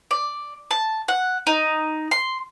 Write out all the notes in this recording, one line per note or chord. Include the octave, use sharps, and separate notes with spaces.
D5
A5
F#5
D#4
C6